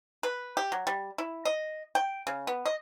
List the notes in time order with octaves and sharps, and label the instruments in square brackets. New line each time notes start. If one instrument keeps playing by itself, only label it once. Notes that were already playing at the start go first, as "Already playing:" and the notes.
[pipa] B4
G4
F#3
G3
E4
D#5
G5
C#3
B3
D#5